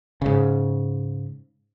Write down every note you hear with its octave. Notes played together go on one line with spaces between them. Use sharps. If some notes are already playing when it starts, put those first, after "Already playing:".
G#2 C#3